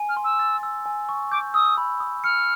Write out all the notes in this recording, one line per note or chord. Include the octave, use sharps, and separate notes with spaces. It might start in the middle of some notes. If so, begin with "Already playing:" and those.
Already playing: G#5
F6
C6
E6
A6
E6
G#5
C#6
D6 G6
D#6 E6
B5
D#6
F6 C#7